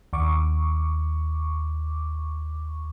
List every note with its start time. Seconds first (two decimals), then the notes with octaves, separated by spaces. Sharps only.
0.13 D#2 C#6 D6